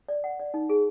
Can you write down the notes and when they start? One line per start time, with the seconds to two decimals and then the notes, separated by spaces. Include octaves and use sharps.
0.09 D5
0.24 F#5
0.39 D5
0.54 D#4
0.69 G#4